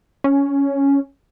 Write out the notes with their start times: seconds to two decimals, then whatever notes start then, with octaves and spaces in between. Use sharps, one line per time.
0.24 C#4